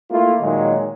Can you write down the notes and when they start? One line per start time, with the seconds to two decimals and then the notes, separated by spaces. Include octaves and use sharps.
0.11 A3 A#3 E4 F4
0.40 A#2 D#3 F#3 G#3 D#4